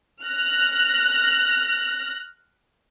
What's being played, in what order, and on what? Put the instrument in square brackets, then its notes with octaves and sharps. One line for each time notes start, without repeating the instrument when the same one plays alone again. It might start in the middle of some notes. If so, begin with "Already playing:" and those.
[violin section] F6 F#6 A#6